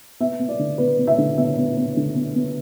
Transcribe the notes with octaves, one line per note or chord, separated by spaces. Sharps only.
B3 E5
B3
D5
D3
B3 B4
B3
E5
D3
B3 E5
B3
B3
D3
B3
B3